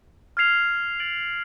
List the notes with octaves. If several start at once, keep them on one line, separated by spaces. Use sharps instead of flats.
F6 G#6 C7 F7
A6 D7 F#7